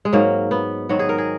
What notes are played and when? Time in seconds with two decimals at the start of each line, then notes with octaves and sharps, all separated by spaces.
0.05 G#3
0.13 G#2 F#3 A#3
0.51 B3
0.89 G#2 D#3 F#3 F#4
0.99 G#4
1.09 A#4
1.18 G#4